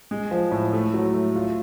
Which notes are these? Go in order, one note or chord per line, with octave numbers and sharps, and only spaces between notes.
G#3
F3
A2
A3
F#3
A3
F4